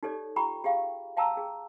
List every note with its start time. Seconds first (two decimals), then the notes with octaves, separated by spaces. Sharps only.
0.03 D#4 G4 A4 C#5 D5
0.36 F4 G4 G5 A#5 B5 C#6
0.64 G4 G#4 F5 G5
1.17 F5 G5 A5 A#5 E6
1.37 G#4